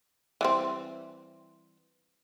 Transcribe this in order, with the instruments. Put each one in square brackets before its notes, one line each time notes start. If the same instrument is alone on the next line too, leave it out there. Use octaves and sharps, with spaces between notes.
[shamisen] E3 G3 C4